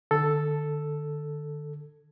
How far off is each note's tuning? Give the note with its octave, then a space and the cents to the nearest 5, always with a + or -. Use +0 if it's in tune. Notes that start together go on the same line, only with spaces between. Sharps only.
D3 +35 A4 +0